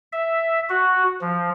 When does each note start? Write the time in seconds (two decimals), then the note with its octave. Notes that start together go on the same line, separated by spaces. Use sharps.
0.13 E5
0.69 F#4
1.21 F3